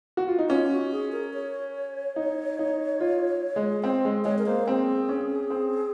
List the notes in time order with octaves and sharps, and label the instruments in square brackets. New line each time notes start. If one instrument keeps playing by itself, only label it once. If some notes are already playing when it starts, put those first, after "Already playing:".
[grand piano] F#4
F4
D#4
[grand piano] C#4 [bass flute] F4
[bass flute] F#4
G#4
A#4
C#5
[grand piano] D#4
D#4
F4
G#3
[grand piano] C4 [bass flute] C5
[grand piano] G#3
[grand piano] G#3 [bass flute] C#5
[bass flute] A#4
[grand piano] A#3 [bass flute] C5
[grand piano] C4 [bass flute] G#4
[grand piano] C#4
C4